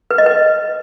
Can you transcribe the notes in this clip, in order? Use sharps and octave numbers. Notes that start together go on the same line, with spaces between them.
B4
D#5
B4